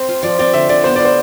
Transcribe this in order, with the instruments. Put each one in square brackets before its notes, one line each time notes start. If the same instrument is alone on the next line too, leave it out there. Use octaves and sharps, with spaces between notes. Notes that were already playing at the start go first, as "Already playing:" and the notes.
Already playing: [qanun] C4
F4
[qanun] F3 [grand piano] D5
[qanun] C4 [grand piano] D5
[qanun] D3 [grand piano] E5
[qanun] D3 [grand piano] D5
[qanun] B3 [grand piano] C5
[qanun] F4 [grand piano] D5
[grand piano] C5